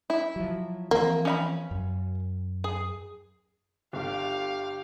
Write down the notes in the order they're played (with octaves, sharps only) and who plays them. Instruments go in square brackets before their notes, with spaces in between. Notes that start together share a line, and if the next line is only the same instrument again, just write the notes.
[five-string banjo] E4
[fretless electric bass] F3 F#3
[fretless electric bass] E3 F3 C4 [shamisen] A#3
[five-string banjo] C#4 E5 B5
[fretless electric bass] F#2
[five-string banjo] G#4
[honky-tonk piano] G1 G2 [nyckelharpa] G4 [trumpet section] F5